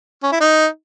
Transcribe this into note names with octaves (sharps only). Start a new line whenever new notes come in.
C#4
E4
D#4